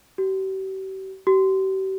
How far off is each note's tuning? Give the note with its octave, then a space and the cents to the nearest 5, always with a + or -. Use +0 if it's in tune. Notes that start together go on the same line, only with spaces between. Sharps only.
G4 -40
G4 -40